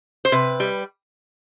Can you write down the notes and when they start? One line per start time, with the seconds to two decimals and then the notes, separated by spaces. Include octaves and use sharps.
0.25 C5
0.32 C3 B4
0.60 G3